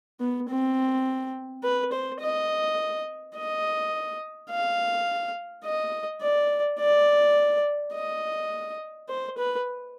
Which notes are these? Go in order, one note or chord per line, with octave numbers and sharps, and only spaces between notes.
B3
C4
B4
C5
D#5
D#5
F5
D#5
D5
D5
D#5
C5
B4